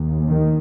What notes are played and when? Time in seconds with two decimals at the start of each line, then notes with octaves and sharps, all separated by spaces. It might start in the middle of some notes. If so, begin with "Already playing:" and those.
Already playing: D#2
0.30 D#3